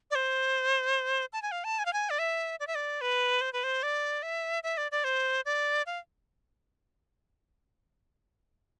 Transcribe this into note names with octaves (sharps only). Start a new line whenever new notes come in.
D5
C5
A5
G#5
F5
A5
G#5
F5
G#5
D5
E5
D5
E5
D5
B4
C5
B4
C5
D5
E5
E5
D5
D5
C5
D5
F5